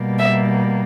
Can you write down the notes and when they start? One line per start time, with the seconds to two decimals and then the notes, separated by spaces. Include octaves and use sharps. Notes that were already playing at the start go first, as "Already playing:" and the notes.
Already playing: B2 G3 A#3
0.19 E5